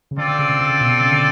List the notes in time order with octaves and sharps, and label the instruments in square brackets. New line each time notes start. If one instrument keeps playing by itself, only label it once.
[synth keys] C#3
[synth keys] D3 [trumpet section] C4 F4 A4 D5
[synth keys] D3
C#3
C3
C3
C#3
B2
C3
C#3
D3